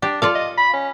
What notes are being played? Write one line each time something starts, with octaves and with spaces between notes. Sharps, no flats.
D4 G4
F4 A4 D5 F5
D#5
B5
C#4